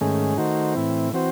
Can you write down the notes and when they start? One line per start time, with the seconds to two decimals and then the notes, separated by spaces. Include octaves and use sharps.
0.01 G#2 D#3 A3 C#4 G#4
0.38 D#3 A3 D#4 F#4 C5
0.75 A2 E3 C4 E4
1.13 E3 C4 F#4 C5